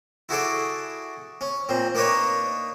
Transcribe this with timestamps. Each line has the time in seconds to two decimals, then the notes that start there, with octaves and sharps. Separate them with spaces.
0.29 E4 F#4 G#4 A4 D5
1.41 C#4
1.69 A#2 C4
1.95 A#3 D4 D#4 B4 C#5